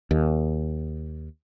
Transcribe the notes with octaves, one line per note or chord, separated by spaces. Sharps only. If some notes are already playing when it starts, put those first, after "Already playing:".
D#2